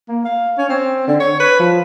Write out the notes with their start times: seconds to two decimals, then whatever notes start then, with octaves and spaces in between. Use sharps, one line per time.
0.09 A#3
0.25 F5
0.58 C#4
0.69 C4
1.07 D3
1.20 C#5
1.40 B4
1.60 F3